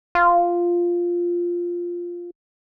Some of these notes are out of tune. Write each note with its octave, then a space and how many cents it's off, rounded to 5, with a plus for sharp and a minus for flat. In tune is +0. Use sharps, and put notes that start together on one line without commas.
F4 +0